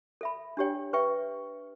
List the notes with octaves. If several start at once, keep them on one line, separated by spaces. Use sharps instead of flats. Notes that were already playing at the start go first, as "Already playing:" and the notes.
A4 E5 B5
D4 G4 C#5 G5
B4 E5 G5 C#6